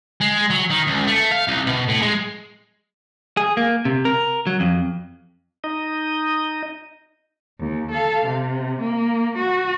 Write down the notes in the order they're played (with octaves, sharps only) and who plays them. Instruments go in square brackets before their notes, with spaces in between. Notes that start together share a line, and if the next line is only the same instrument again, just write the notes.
[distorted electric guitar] G#3
F#3
D#3
C#2
A3
F5
C2
B2
A2
G#3
[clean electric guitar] G#4
A#3
C3
A#4
F#3
F2
[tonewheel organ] D#4 D#5
[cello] D#2
A4 F5
C3
A#3
F#4